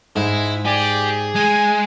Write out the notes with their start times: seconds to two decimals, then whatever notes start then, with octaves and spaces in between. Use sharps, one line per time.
0.16 G#2 G#3 E4
0.66 G4 G#4 D5
1.35 G#3 G#5